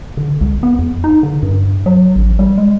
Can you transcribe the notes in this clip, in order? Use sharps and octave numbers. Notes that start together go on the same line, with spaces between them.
D3
C#2
B3
F2
D#4
D3
G2
F#3
A1
G3
G#3